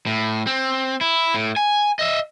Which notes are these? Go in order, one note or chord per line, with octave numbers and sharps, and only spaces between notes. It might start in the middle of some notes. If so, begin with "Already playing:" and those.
A2
C4
E4
A2
G#5
D#5 E5